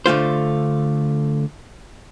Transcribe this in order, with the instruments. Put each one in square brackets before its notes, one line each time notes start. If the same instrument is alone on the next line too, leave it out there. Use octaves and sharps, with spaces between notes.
[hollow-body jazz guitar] D3 A3 F4 C5